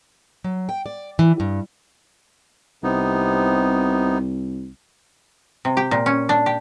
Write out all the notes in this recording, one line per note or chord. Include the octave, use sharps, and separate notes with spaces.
F#3
G5
D5
E3
G2
C2 C3 B3 D#4
C3
G4
A#2
C#4
D4
G4